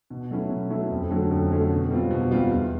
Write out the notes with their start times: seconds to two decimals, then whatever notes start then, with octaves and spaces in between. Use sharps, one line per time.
0.10 B2
0.31 F#3 A3 C#4 E4
0.50 B2
0.70 F#3 A3 C#4 E4
0.90 F2
1.11 D3 F#3 A3 C#4
1.31 F2
1.51 D3 F#3 A3 C#4
1.71 B2
1.91 G3 C4 F4
2.11 B2
2.31 G3 C4 F4
2.51 E2